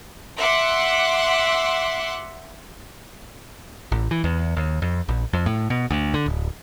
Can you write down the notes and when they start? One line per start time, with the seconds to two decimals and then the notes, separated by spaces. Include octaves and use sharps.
0.37 E5 F#5 C6 D6
3.92 A1
4.11 E3
4.24 E2
4.57 D#2
4.82 F2
5.09 A#1
5.33 F2
5.46 A2
5.70 B2
5.91 D2
6.14 D3
6.26 D1